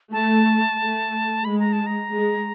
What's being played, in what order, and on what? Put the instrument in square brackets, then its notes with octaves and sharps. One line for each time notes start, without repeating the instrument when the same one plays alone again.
[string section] A3 [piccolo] A5
[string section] A3
[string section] G#3 [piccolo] B5
[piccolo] A#5
A5
A#5
[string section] G#3